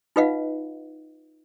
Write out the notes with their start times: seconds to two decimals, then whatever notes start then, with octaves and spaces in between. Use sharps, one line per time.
0.16 D#4 F4 B4 D#5 F5 F#5